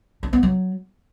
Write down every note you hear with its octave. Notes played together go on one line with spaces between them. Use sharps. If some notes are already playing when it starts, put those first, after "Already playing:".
D4
B3
F#3